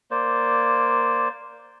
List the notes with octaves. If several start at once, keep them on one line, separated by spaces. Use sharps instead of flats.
A#3 C5 D5